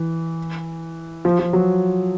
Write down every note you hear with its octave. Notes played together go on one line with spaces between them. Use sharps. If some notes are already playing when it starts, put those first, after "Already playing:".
Already playing: E3
F3
F3
F#3